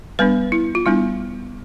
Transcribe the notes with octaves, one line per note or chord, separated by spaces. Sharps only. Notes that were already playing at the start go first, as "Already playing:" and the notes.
G3 B3 D4 B4
E4
F4
G3 B3 D4 E4